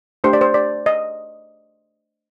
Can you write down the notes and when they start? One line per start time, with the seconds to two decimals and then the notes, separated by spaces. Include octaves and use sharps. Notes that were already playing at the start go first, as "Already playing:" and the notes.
0.24 A3 D4 G4 C5
0.33 D5
0.41 C5
0.54 D5
0.86 D#5